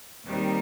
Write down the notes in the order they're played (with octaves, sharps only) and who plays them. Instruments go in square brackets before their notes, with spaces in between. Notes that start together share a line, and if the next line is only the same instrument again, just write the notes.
[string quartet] D#2 D#3 G3 C4 D#4